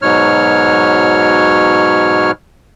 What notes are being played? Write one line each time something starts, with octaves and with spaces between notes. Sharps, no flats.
G#2 B2 F#3 C#5 F6